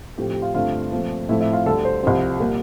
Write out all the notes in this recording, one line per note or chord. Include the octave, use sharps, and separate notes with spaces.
A2 F3 A3 C4 G4
G4
F4
G2 D3 A3 C4 F4
A#2 F3 A3 C4
A2 F3 A3 C4 E4
E4
F4
D2 D3 G3 A4
C5
C2 C3 F3 C4
A#2 G3 A#3